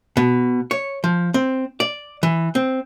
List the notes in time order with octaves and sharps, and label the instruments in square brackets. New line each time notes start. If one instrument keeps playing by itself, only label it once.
[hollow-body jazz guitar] B2
C#5
F3
C4
D5
E3
C4